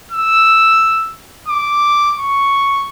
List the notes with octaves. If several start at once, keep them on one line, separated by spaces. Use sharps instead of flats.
E6
D6
C#6